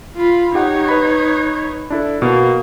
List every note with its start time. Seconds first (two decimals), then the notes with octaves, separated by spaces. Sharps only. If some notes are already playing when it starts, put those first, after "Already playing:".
0.16 F4 B5
0.55 D#4 G4 C#5 F#5
0.88 B4 B5
1.90 D4 E4 A4
2.22 B2 A#3